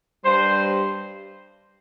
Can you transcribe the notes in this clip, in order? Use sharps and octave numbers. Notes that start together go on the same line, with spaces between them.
G2 G3 C5